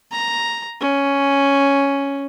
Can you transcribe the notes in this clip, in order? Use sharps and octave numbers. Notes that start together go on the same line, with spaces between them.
A#5
C#4